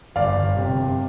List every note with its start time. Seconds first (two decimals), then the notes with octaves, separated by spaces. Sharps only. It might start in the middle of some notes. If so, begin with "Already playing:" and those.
0.16 G1 D5 F5
0.36 G1
0.56 C3
0.78 G1